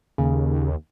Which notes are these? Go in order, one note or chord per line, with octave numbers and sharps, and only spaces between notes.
D#2 C#3